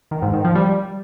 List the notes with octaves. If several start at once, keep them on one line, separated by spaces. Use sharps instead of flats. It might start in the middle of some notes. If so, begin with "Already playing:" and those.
D#3
G#2
D#3
F3
G3